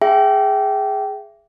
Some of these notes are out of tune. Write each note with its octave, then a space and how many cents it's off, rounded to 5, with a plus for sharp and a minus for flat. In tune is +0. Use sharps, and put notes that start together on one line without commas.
G#4 +0 E5 +25 G5 -25